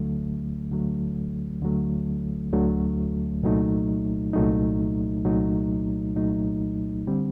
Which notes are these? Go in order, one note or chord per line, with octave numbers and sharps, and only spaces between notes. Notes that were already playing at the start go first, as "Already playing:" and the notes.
Already playing: D2 D3 F#3 A3
D2 D3 F#3 A3
D2 D3 F#3 A3
D2 D3 F#3 A3
C2 A#2 F#3 A3 D#4
C2 A#2 F#3 A3 D#4
C2 A#2 F#3 A3 D#4
C2 A#2 F#3 A3 D#4
D3 G3 C4